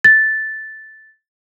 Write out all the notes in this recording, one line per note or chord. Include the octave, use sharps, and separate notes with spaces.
A6